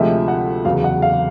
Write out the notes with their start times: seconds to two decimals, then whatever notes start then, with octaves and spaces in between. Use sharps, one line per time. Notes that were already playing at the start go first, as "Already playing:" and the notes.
Already playing: D2 C3 F3 G#3 C4 E5
0.28 F#5
0.65 E2 C#3 F#3 F5
0.84 F#5
1.02 F5